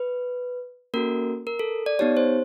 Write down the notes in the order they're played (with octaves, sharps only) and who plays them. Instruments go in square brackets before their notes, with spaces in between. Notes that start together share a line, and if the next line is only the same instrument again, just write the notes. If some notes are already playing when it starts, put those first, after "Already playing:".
Already playing: [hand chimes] B4
A#3 C#4 F#4 A4 A#4
A#4
A4
D5
B3 D#4 G4 C#5
C5